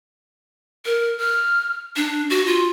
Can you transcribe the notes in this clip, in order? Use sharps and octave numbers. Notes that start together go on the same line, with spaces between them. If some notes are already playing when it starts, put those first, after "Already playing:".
A#4
F6
D4
F#4
F4